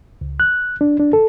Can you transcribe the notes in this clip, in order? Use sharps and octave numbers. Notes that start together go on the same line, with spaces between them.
C#2
F#6
D4
D4
A4